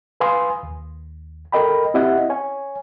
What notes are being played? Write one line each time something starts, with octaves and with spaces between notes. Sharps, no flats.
B4 F5 G#5 C6 D#6
D#2
A4 A#4 D#5 G5 B5
C4 E4 G4 D#5 E5 F#5
C#5 G#5